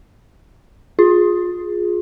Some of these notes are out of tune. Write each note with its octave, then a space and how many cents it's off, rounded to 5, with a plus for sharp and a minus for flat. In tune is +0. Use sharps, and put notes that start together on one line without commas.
F4 +25 G#4 +0